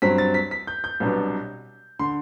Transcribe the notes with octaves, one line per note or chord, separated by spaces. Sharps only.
G2 F#3 C4 B6
A6
B6
B6
G6
G6
C2 B2 F#3 B3 D4
D3 C6